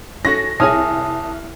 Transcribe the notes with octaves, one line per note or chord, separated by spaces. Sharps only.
C#4 F#4 A4 A#6
C2 G#4 C#5 G#5 A5 D#6 F6